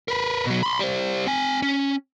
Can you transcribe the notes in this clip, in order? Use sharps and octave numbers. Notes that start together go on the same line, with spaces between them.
A#4 B4
B2 F#3
B5 C6
G3 C5
C4 G#5
C#4